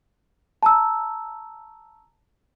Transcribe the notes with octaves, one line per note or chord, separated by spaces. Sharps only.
A5 A#5 E6